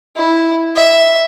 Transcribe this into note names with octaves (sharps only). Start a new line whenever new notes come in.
E4
E5